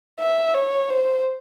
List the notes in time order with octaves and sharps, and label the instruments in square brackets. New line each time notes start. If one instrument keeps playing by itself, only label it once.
[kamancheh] E5
C#5
C5